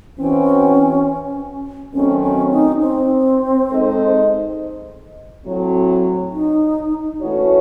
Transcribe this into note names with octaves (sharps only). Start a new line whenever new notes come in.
E3 C4 C#4 F#4
D#3 F#3 A3 C4 C#4
C#4
D#4
C4
G#3 D#4 A4 C5 D#5
A2 F#3 C4
D#4
E3 A3 C#4 E4 F#4 C#5